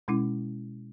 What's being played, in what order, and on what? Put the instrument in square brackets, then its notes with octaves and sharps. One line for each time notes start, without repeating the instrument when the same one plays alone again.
[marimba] B2 G#3 C#4 E4